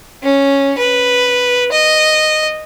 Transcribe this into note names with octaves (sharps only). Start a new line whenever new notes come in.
C#4
B4
D#5